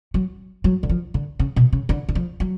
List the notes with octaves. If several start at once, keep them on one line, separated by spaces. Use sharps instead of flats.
F#3
F#3
D3
F3
D3
C#3
B2
C#3
D3
D3
F3
F#3